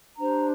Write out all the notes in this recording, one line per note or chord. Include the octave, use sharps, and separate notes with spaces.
D4 G4 C5 A#5